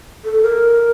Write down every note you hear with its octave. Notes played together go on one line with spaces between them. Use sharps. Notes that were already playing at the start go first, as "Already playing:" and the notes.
A4
A#4